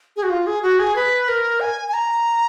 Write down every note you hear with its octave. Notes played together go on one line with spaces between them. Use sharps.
G#4
F#4
F4
G#4
F#4
G#4
B4
A#4
G#5
G#5
A#5